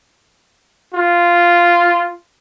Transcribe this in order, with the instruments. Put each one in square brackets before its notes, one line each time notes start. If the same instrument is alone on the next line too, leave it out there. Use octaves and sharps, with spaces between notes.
[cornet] F4